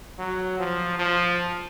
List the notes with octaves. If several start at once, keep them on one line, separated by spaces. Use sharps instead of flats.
F#3
F3
F3